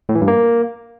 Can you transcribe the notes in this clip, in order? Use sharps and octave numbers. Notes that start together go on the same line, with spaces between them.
A2
E3
G2
A#3